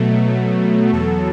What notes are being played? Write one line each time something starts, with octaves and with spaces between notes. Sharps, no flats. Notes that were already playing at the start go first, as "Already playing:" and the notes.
Already playing: B2 F#3 A3
E2 B2 F#3 A4